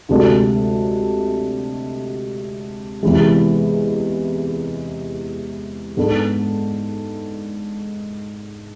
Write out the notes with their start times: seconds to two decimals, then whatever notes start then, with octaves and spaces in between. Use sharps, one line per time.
0.09 D2 C3 G#3 D4 A4
3.03 E2 C3 E3 G#3
5.97 G#2 G#3 B3 D4 A4